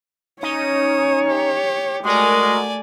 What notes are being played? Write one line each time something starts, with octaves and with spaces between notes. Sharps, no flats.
C#4 D#4 C#5 D#6
G4
G#3 A3 F#4 A#4 D5 G#5